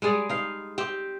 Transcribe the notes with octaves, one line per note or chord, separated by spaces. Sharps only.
G3 G#3 G#4 D5
D#4 F5
C4 G4